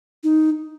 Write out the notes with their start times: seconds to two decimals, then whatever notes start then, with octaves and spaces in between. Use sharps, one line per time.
0.23 D#4